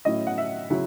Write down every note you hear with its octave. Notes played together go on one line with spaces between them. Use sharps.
A2 F#3 C#4 E4 D#5
F#5
E5
C#3 F#3 C#4 E4